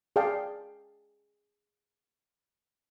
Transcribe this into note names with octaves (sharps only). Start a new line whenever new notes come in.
G#4 D5 F5 G5 A5